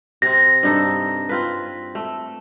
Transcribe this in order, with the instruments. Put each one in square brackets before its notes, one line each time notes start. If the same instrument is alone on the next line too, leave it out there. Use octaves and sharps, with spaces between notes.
[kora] C3 C4 [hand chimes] A#6
[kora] G2 D#4 A4
C4 F4 B4
A3